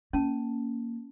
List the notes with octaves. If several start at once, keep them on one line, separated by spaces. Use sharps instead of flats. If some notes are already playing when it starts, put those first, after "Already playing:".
A#3 C#4 A5